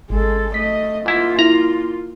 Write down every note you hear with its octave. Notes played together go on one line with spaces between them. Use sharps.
G#1 G#3 A4
A3 D#5 B6
G#2 A#3 E4 F4
E4 A#5